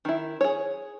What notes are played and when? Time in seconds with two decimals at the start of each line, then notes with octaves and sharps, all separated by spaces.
0.05 D#3 E4
0.41 G#4 C#5